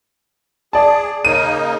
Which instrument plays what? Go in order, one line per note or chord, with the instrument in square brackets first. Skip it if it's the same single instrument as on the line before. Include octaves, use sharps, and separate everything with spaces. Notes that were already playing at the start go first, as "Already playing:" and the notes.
[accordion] G#4 [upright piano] D5 A5
[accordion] C#3 A#3 D#4 [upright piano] D#7